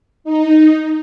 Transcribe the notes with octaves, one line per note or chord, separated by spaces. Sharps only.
D#4